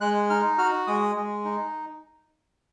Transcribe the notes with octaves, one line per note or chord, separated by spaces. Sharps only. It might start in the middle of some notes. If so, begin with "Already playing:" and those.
G#3 F#6
D#4 F6
F#4 F6
G#3 D#6
G#3
D#4